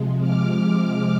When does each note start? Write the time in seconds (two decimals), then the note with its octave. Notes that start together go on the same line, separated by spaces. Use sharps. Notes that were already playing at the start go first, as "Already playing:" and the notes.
Already playing: C3 F3 G#3
0.19 D6 F6
0.63 D6 F6